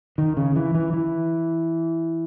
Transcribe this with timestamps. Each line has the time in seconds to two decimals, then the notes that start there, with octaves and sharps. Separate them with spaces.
0.18 D#3
0.37 C#3
0.56 E3
0.75 E3
0.93 E3